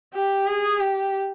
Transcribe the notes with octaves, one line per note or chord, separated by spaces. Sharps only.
G4
G#4
G4